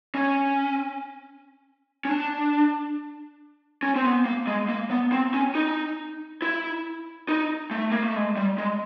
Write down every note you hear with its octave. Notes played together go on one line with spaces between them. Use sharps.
C#4
C#4
D4
C#4
C4
B3
A#3
G#3
A#3
B3
C4
C#4
D#4
E4
D#4
A3
A#3
A3
G#3
G3
G#3